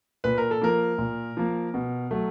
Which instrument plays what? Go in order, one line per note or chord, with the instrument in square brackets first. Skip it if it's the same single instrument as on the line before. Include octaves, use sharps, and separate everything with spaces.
[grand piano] A#2 B4
A#4
A4
F3 A#3 A#4
A#2
F3 A#3
B2
F#3 A3